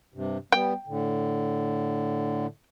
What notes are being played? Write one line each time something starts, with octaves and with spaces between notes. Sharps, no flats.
G2 C3
G3 B3 G5
A2 D3